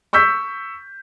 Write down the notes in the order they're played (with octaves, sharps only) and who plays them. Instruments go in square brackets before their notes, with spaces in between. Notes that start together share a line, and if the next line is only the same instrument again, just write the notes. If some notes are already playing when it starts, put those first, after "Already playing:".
[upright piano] C#6 E6 G6 B6